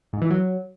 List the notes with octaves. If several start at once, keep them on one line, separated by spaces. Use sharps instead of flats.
G#2
E3
F#3